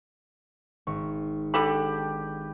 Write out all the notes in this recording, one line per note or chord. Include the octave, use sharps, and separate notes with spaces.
G#1 C#6
D3 G4 A4 B4 B5